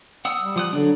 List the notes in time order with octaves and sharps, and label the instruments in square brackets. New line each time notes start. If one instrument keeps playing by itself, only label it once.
[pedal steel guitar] F#5 D#6 E6
[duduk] G3
[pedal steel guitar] F3 D#6 F#6
[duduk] D3 [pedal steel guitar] F#3 D4